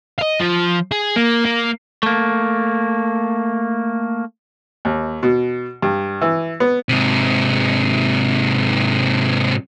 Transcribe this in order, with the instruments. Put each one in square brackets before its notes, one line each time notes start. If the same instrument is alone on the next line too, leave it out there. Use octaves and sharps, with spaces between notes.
[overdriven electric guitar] D#5 F5
F3
G#4
A#3
A#3
[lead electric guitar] A3 A#3
[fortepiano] D#2
B2
G2
E3
B3
[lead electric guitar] G#2 C3